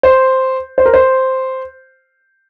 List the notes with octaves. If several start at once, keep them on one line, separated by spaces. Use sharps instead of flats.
C5
C5
A#4
C5